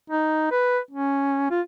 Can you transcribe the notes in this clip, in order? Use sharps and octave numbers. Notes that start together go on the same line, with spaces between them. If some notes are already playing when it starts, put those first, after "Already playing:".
D#4
B4
C#4
F4